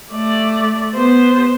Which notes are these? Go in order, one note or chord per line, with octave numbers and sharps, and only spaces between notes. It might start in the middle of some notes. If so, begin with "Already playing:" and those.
A3 D5
B3 C5